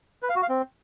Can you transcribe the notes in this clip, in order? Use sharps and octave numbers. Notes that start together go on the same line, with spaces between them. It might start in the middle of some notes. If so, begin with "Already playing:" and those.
B4
F5
F#4
F5
C4